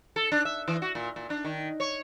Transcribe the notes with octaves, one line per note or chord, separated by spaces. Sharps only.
A4
D4
E5
E3
F#4
A#2
A#2
D4
D#3
C#5